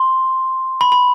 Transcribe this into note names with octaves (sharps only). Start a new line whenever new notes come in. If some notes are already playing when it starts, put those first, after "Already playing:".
Already playing: C6
B5
B5